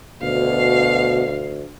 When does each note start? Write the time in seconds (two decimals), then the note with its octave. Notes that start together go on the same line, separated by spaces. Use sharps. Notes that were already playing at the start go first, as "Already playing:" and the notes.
0.22 D2 B2 F5